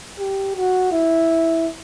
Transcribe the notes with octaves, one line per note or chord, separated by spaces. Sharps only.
G4
F#4
E4